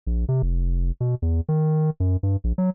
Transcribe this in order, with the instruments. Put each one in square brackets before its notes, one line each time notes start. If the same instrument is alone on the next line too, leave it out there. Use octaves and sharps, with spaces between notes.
[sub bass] A#1
C3
F1
B2
E2
D#3
F#2
G2
A#1
F#3